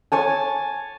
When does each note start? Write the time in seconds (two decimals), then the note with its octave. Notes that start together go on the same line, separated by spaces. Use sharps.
0.12 C#5 G#5 A5